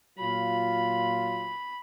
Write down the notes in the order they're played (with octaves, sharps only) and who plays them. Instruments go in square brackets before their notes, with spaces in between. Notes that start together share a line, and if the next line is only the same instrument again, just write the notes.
[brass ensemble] A#2 F#3 F4 [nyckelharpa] B5